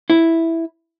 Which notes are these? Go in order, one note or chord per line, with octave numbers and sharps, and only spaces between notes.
E4